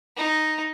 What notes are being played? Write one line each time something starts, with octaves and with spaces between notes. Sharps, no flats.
D#4